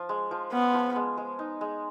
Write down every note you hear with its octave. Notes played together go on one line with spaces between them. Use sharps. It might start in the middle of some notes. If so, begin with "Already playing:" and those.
Already playing: F3
G#3
F3
B3 C#4
F3
G#3
G#3
D#4
G#3